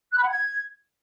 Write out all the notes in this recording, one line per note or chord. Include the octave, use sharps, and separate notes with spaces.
F#6
B5
F#5
G#6